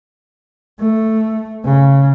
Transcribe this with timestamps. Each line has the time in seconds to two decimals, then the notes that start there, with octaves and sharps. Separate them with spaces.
0.80 A3
1.65 C#3